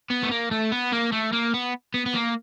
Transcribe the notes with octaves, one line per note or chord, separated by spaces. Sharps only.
B3
A3
A#3
A3
B3
A#3
A3
A#3
B3
B3
B3
A#3